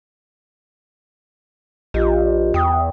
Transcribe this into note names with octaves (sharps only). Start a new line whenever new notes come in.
A#1 F4 G4 D#5
E2 G5 D#6